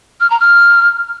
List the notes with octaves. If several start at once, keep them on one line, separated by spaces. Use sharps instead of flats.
F6
A#5
F6